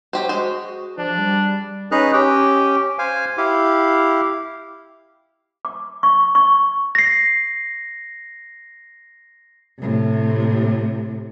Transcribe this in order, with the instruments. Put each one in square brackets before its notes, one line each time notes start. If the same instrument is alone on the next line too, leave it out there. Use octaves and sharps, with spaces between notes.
[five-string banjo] F#3 G4 C5 [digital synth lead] F#4
[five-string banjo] G#3 C5
[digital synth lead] F3 [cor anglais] D4
[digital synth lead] G3
[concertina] C#4 D#4 G#4 B4 A#5 F#6
C#4 G4 G5
C5 F5 G#5
E4 G4 F5
[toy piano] D6
C#6
C#6
[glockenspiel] A#6 C7
[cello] A2 C3